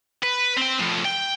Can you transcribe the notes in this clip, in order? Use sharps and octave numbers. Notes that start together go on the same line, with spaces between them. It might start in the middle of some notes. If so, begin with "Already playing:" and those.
B4
C4 G5
A2 F3
G5